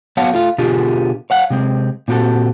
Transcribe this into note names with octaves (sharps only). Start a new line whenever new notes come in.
F#3 B3 C#5 F5 F#5 A5
A3 F4 F5
B2 D3 F4 G4 G#4
C#5 F5 F#5
C3 G#3 C4
A#2 C4 F#4 G4 A4